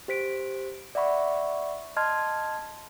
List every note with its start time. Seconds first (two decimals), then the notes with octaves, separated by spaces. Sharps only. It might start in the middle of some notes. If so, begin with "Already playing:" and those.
0.08 G4 C5 B6 D7
0.95 D5 E5 F#5 B5 C#6
1.96 D#5 A5 C6 F6 G#6